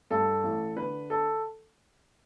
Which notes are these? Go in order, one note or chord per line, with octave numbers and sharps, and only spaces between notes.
G2 A4
A1
D3 B4
A4